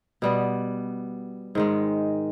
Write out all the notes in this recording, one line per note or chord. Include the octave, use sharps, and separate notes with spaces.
B2 G3 B3
G#2 D#3 G#3